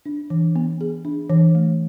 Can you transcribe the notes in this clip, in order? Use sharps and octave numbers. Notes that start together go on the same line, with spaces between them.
D4
E3
B3
G#4
D4
E3
A3